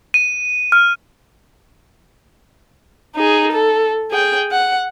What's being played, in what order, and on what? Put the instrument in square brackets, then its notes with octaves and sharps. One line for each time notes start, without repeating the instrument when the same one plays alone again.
[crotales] D#7
F6
[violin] D#4 G#4
A4
G#4 G5
F#5